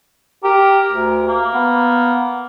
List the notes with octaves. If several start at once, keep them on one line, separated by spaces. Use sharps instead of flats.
G4 A#4
D2
A#3
B3